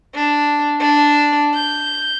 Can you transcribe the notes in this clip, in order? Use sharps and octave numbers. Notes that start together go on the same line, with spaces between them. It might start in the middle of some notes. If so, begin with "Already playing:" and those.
D4
D4
G6